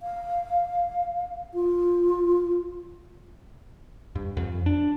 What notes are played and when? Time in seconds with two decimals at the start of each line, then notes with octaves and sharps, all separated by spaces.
0.01 F5
1.54 F4
4.15 G2
4.37 F2
4.66 D4